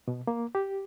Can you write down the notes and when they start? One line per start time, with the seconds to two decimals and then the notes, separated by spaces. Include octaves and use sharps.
0.08 B2
0.27 A#3
0.55 G4